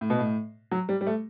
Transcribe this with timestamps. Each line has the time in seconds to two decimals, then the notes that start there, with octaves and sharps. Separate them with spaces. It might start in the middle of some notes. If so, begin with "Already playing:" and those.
0.01 A2
0.10 B2
0.18 A2
0.71 F#3
0.89 G3
1.01 G3
1.07 A3